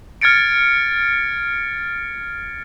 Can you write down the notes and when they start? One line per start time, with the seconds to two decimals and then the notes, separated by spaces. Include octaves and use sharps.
0.21 F6 G#6 A6 C#7 D7